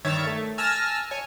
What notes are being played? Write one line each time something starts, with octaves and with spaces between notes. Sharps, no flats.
G2 D#3 C#5 E5 A6
A3
G#5 A5 E6 F6 A#6
C#5 G#5